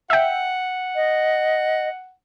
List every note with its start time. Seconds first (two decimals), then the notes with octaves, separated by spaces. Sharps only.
0.10 E5 F#5 G5
0.96 D#5